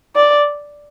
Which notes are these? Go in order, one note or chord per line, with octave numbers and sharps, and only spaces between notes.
D5